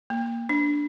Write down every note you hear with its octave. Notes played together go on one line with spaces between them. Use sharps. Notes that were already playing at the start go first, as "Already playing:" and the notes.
A#3
D4